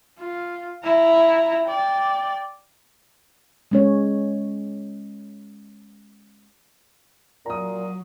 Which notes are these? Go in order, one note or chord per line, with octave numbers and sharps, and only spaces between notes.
F4
E4 A#5
D5 G5
G#3 C#4 C#5
A#2 F#3 A#5 D#6